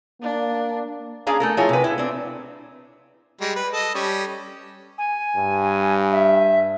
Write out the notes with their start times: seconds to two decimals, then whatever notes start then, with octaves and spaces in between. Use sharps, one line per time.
0.22 A#3 D4
1.27 C#4 D4 G#4 F5 A#5
1.40 A3 A4 A#4
1.57 F3 E4 F4 G#4 A#4 C#5
1.69 C3 B4
1.84 E4
1.98 C4 D4
3.41 G3 G#3
3.56 B4
3.72 A4 D#5
3.95 G3 C#4
4.98 G#5
5.36 G2
6.12 E5